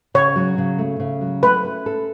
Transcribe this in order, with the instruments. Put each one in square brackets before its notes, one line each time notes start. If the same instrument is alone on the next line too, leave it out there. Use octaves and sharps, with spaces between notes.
[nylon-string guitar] C#3 [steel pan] C#5
[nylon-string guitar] F#3
C#3
A3
C#3
F#3
[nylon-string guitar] A3 [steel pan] B4
[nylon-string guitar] C#4
A4